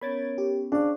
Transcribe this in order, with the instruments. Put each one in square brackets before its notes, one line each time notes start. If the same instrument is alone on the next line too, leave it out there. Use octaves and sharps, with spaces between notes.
[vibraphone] B3 C#4 [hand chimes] A#4 C#5 D7 [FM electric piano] B5 G#6 A6
[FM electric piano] G4
[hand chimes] C#4 [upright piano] D4 [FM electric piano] G#4 F5 [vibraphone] C5 C#6